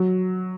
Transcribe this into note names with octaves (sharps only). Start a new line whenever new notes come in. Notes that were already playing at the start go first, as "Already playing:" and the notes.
Already playing: F#3